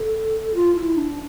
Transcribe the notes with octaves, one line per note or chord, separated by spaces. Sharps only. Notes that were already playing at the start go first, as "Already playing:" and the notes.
Already playing: A4
F4
E4
D4